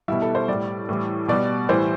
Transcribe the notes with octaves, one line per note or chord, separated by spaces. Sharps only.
B2 G3 E4
A4
C5
A2 G3 D5
A2 E3 G3
B2 G3 D5
A2 E3 G3 C5